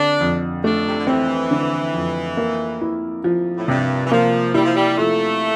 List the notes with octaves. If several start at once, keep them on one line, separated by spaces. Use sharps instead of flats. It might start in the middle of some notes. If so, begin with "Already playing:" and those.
Already playing: D3 C4 D4
F2
A3 D4
C3
D3
E3 C4
D3
F2
A#3
E4
F3
A2
G2 C3
E3
F3 A#3
G3 E4
F3
G3
F3 A3